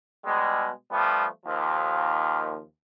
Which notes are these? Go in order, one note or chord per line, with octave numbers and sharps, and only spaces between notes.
B2 G3 G#3
F3 G3 A3 B3
D#2 F3